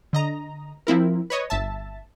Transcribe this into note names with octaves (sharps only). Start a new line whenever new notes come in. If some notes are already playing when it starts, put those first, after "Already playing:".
D3 D#5 A#5
F3 C4 E4 A#4
B4 C#5 D#5
G1 E5 A5